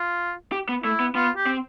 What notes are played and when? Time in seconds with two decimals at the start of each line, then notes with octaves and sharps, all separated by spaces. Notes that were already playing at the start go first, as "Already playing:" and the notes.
Already playing: F4
0.52 G4
0.69 B3
0.84 A3 E4
1.00 B3
1.15 B3 F4
1.36 G4
1.46 C4